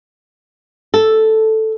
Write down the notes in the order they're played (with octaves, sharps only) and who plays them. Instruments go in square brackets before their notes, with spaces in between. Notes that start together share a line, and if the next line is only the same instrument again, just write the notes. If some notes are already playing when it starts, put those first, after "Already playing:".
[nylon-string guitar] A4